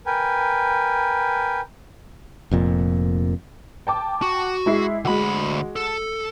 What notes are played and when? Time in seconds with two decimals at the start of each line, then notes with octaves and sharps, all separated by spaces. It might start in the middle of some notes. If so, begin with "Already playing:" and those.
0.06 A#4 B4 G5 G#5
2.51 F1 F2 A#2
3.87 G5 A5 D6
4.22 F#4
4.66 G#3 E4 C7
5.05 D2 G#3 F#4 B5
5.76 A4